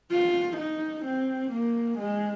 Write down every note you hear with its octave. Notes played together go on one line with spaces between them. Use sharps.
F4
D#4
C4
A#3
G#3